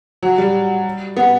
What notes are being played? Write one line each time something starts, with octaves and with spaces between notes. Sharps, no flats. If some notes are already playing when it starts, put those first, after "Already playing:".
F#3
G3
B3